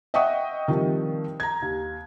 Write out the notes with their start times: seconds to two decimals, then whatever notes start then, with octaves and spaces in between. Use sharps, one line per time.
0.14 D#5 E5 F#5 G5 C#6 D#6
0.68 D#3 F3 G3 C4
1.40 A#5 G#6
1.62 D#2